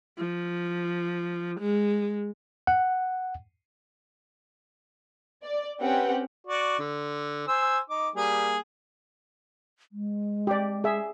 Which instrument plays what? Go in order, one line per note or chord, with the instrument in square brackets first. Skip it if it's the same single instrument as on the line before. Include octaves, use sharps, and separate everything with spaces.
[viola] F3
G#3
[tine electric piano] F#5
[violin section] D5
C4 C#4 G4 B4 F#5 G5
[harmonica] F#4 D5
D3
C5 G#5 E6
D#4 D6
G3 A#3 G#4
[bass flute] G#3
[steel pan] G4 D5
G#4 E5